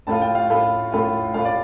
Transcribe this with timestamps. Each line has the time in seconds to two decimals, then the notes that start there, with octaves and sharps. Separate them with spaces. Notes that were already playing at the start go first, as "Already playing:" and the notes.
0.07 A2 A3 F4 A5
0.22 G5
0.35 F5
0.50 A2 A3 F4
0.92 A2 A3 F4
1.34 A2 A3 F4 F5
1.45 D5